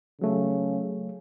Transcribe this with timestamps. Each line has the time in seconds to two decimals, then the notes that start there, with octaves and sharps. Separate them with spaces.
0.21 C#3 F#3 A3